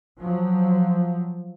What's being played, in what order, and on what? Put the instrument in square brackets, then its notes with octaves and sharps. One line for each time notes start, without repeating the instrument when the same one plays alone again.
[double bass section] F3 F#3